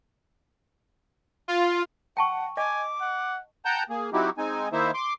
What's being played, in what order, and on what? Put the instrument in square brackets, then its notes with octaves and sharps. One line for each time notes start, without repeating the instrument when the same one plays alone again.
[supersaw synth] F4
[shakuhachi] F#5 [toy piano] G5 A5 C#6
[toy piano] D#5 [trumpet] G#5 [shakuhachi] D6
[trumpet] F#5
[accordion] F#5 G5 A5 A#5 G6
A#3 G#4
F#3 C4 D#4 E4 F#4 G4
G#3 C4 D#4 G#5
D#3 A#3 D#4 E4 C5 E5
C6 D6